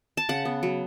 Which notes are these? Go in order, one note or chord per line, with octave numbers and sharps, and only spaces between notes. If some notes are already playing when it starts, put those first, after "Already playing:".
A5
C#3 F#5
B3
F#3